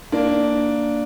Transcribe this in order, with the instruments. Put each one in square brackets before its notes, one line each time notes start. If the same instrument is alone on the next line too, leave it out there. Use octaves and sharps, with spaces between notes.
[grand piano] A#3 D4